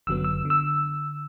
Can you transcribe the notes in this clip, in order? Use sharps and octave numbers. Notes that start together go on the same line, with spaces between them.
G1 F#2 D3 F#3 B3 E6
E6
D3
E6